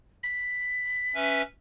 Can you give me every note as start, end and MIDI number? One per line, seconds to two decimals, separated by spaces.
0.23 1.39 95
1.15 1.42 61
1.15 1.42 71
1.15 1.42 76